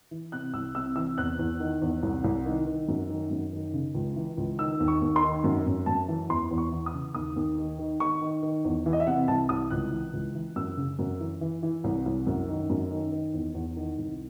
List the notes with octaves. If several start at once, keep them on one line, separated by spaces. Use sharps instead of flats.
E3
C3 F#6
C2 E6
C3 E6
E3 E6
E2 F#6
E2
D#3
E2
C2
C2
D#3
D#3
F#2
D#3
F#2
D#3
C#3
C#2
E3
C#2
D#3 E6
D#2
C#6
D#2
C6
D#3
F#2
F#2
F#2 A5
E3
E2 C6
E2
C#6
E3
D#6
C#3
D#2 D#6
D#2
D#3
D#3
D#3 C#6
D#3
D#3
E2
E3
D#5
E5
C3 F#5
C2 A5
C2 D#6
C#2 F#6
E3
C#2
E3
F#2 E6
C#3
F#2
E3
E3
E3
C2
C2
F#2
D#3
F#2
D#3
D#3
E2
E2
D#3
C2